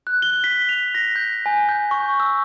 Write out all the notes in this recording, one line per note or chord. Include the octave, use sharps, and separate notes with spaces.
F#6
G7
B6
F7
A#6
G6
G#5
G6
C#6
E6